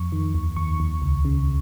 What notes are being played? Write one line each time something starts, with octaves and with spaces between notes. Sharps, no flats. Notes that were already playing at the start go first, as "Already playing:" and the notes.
Already playing: F2 C#6
D#3
D#2
D#2 C#6
D#2
C#2
C#3